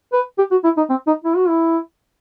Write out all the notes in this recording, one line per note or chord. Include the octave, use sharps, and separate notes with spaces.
B4
G4
F#4
E4
D#4
C4
D#4
E4
F#4
E4